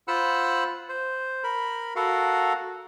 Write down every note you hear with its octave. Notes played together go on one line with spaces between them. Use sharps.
F4 C5 F#5 B5 E6 F#6
C5
A#4 B5
F#4 A4 A#4 F5 F#5